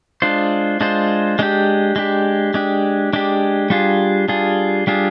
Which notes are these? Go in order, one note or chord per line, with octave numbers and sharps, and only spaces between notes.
G#3 D4 F4 C5
G#3 D4 F4 C5
G#3 D4 G4
G#3 D4 G4
G#3 D4 G4
G#3 D4 G4
G3 D4 F4 G#4
G3 D4 F4 G#4
G3 D4 F4 G#4